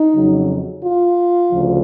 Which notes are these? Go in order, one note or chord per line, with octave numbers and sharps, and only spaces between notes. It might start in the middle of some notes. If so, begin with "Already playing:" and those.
Already playing: D#4
F2 C#3 F#3
F4
D2 C#3 F3